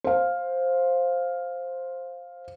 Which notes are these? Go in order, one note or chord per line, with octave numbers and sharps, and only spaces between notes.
C5 F5